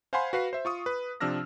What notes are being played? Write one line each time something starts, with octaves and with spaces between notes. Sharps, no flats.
C5 F5 F#5 G#5 B5 C6
F#4 B4 F5 C7
C5 E5
F4 C#6 D#6
B4
C3 F3 D4 E6 F6 A#6